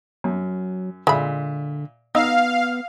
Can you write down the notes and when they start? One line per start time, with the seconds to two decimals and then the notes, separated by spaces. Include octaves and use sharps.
0.24 F#2 F#3
1.07 A#2 D3 G#3 E5 B5
2.15 B3 D#4 D#5 F5 E6